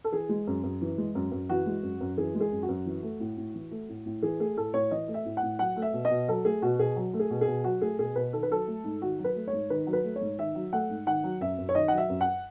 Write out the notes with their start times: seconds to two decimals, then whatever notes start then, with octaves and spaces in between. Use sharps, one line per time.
0.04 A4
0.12 E3 G#4
0.29 G#3
0.47 F#2
0.63 F#2
0.81 E3
0.98 G#3
1.15 F#2
1.31 F#2
1.49 E3 F#4
1.66 G#3
1.83 F#2
2.00 F#2
2.18 E3 G#4
2.35 G#3
2.40 G#4
2.52 F#2
2.63 F#4
2.68 F#2
2.86 E3
3.03 A3
3.20 A2
3.37 A2
3.54 E3
3.71 A3
3.89 A2
4.06 A2
4.23 E3 G#4
4.39 A3 G#4
4.57 A2 A4
4.74 A2 C#5
4.91 E3 D#5
5.08 A3
5.14 E5
5.25 A2
5.37 F#5
5.43 A2
5.59 F#3 F#5
5.76 A3
5.82 E5
5.93 B2
6.05 D#5
6.10 B2
6.28 F#3 A4
6.45 A3 G#4
6.62 B2 F#4
6.79 B2 G#4
6.96 F#3
7.13 A3
7.19 G#4
7.30 B2
7.41 G#4
7.47 B2
7.64 F#3 F#4
7.81 A3 G#4
7.99 B2 G#4
8.16 B2 B4
8.33 D#3 A4
8.43 B4
8.50 F#3 A4
8.67 A3
8.84 G#2
9.01 D#3 F#4
9.19 F#3
9.24 B4
9.35 A3
9.47 C#5
9.53 G#2
9.70 D#3 B4
9.87 F#3
9.93 B4
10.04 A3
10.16 C#5
10.21 G#2
10.38 D#3 E5
10.55 F#3
10.73 A3 F#5
10.90 G#2
11.06 D#3 F#5
11.24 F#3
11.41 F#2 E5
11.58 F#2
11.69 C#5
11.75 D#3 D#5
11.88 F#3 F#5
11.98 E5
12.09 F#2
12.21 F#5